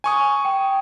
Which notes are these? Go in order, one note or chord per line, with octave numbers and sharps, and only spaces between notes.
G#5 C#6 D#6
G5